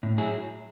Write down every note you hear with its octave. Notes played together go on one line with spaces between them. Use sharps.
A2
F#3 E4 G#4